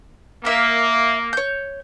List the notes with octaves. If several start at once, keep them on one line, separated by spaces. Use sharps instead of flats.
A#3 A#4 E5 F5
C#5 G6